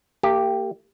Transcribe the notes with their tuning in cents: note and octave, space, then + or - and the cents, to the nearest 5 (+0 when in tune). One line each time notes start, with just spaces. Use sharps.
A#3 -40 G4 +0